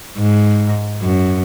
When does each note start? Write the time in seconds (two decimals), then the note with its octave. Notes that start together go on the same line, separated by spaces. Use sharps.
0.18 G#2
1.02 F#2